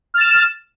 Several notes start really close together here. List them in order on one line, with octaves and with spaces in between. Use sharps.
F6 A6 E7